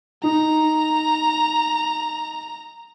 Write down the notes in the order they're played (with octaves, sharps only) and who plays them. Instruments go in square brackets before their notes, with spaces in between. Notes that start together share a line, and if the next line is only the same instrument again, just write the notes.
[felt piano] D#4 [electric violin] A#5